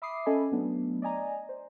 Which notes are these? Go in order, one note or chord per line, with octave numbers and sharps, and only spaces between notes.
E5 B5 D6 D#6 C7
C#4 A4 D#5 G#5 B5
F#3 A3 B3 D4
D5 D#5 G#5 A#5
C5